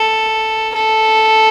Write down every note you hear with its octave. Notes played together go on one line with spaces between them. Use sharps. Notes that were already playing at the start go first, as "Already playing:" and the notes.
Already playing: A4
A4